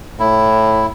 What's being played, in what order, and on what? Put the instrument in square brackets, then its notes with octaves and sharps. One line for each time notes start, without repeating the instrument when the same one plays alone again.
[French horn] A2 [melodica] E4